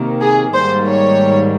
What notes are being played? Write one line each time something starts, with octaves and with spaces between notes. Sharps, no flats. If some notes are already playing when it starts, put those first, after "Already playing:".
Already playing: C3 D#3 A#3
G#4
G#2 D#3 G3 A#3 C5
C#5